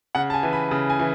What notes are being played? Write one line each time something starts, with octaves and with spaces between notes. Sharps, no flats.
C#3 F#5
A5
G#5
E3
B5
C#3
G#5
E3